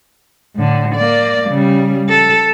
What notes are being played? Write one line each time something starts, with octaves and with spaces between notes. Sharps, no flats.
A2 D3
A#3 D5
C#3 G3
A4